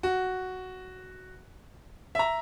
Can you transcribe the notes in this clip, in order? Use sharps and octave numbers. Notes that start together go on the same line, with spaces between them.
F#4
E5 A#5